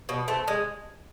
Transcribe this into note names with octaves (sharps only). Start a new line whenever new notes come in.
B2
A3 C4
G#3